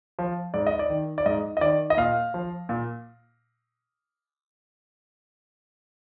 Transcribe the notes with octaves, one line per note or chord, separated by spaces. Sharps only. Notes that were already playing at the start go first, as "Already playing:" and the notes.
F3
G#2 D5
D#5
D5
D#3
D5
G#2 D#5
D#5
D#3 D5
D#5
A#2 F5
F3
A#2